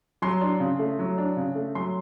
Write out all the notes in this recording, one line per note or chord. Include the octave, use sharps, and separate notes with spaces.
F#3 C6
D4
C#3
A3
F#3
D4
C#3
A3
F#3 C6